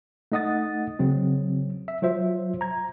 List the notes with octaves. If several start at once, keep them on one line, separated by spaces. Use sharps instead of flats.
A3 D#4 D#5 F#5 D#6 A6
C#3 F#3 C4
E5
F#3 F4 C5 E5
A#5 G#6